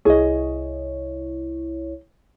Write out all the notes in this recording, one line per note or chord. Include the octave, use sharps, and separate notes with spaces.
C2 E4 G#4 C#5 D#5